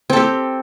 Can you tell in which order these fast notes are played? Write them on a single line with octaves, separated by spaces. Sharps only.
C4 A4 G4